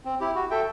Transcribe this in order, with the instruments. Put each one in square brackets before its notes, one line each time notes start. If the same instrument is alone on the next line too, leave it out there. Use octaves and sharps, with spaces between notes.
[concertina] C4
E4 G4
F#4
A4 E5 G5